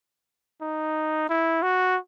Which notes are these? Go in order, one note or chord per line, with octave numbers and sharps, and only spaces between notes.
D#4
E4
F#4